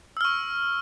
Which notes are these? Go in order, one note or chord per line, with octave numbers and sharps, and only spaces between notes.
C#6 E6 F6